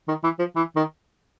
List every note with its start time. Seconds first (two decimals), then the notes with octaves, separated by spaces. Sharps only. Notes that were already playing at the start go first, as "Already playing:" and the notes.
0.08 D#3
0.24 E3
0.39 F3
0.56 E3
0.76 D#3